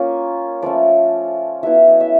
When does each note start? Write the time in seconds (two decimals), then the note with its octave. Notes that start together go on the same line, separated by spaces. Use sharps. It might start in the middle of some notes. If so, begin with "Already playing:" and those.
Already playing: A#3 C#4 F4 C#5
0.62 F3 A3 C#4 D5
1.63 F#3 B3 E4 E5
1.75 F5
1.88 D#5
2.00 E5